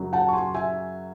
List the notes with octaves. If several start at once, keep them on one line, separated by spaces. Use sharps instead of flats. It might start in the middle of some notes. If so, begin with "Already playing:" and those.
Already playing: F#2 C#3 F#3
F#5 A5
C#6
G#5 C6
E5 G#5